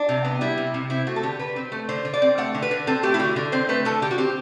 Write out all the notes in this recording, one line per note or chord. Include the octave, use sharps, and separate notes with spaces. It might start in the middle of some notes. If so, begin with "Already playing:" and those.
Already playing: D4
C3
B3
G3 E4
C3
C3
C4 E4
A3 F#4
A4
D3 G4
D3 B4
C4
A3
D3 C5
D3
D5
C4
A3 F#5
D3
B4
D3
C4 A4
A3 G4
E4
D3 F#4
D3
C4 C5
A3 B4
D3 A4
D3 G4
F#4
C4 G4